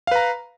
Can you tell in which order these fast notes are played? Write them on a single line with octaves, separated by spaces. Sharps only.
F5 B4 A#5